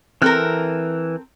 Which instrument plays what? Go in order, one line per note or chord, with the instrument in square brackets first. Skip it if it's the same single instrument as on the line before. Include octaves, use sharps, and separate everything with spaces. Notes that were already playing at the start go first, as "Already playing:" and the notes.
[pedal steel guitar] E3 F6 F#6 [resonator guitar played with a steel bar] C4 A4 A#4